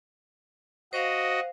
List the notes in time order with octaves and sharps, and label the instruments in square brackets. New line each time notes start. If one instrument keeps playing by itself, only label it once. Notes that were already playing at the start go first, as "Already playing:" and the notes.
[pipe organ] F#4 D#5 [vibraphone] C5 F5